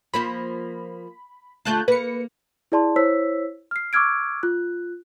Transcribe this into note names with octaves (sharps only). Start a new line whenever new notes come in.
F3 A#3 C5 B5
D3 A3 F4 A5 F#6 G6
A#3 B4 C#7
E4 G#4 D5 A5 C6
E4 C5 C#5 E6 B6
F6 C7
C#6 D6 E6 F6 G#6 D7
F4 F#6